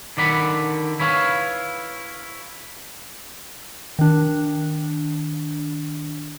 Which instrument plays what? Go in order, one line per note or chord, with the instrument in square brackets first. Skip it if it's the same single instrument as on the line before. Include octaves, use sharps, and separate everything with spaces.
[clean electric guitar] D3 D#3 D5 F#5 B5
E4 B4 C#5 F5
[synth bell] D#3 D4